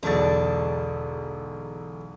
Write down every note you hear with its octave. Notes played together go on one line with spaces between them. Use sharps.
E1 B1 E2 D3 D4 C#6 A6